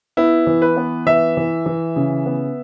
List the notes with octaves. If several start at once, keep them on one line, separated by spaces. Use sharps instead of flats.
B3 E4
E3
B4
B3
E3 E5
E3
E3
C#3
B3